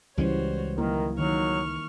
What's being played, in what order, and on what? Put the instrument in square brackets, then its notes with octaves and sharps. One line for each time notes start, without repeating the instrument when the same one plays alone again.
[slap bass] C#2 G#3 C#4 [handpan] E3 G3 [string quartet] F#4 C5 C#5
[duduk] D#3 [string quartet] F#3 [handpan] A#3 E4 A#4
[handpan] D#3 D#4 [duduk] F#3 [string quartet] C#6 F6